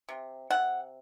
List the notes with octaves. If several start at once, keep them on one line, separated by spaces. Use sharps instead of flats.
C3
C3 F#5